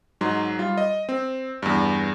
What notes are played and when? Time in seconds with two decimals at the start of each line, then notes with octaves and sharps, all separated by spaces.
0.21 G#2 F#3 D#4 C6
0.59 G3 F4
0.77 D#5
1.09 C4
1.62 E2 G2